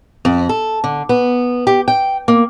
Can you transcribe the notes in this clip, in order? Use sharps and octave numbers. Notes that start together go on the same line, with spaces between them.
F2
A4
D3
B3
G4
G5
A#3